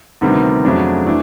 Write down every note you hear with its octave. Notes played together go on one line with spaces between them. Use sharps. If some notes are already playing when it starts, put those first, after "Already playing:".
D2 C3 D#3 G3 B3
F2 C#3 F#3 A3 D4
E3 A3 D4